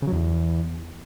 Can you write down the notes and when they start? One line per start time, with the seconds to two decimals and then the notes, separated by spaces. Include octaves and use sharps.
0.02 C#3
0.07 F#3
0.12 E2